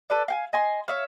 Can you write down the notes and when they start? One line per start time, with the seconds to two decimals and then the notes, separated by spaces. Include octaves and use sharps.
0.10 A4 B4 D5
0.28 F5 G5 G#5
0.53 D#5 G#5 C6
0.88 C#5 E5 F5